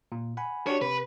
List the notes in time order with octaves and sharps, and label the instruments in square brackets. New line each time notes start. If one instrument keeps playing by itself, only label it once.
[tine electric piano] A#2
F#5 G#5 B5
[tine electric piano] D4 F#4 G4 [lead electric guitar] C#5
[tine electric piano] C3 [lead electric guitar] B4